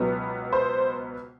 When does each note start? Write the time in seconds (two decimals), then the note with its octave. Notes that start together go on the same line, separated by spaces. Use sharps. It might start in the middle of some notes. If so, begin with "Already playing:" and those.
Already playing: C#2 B2 F#3 B3
0.53 C5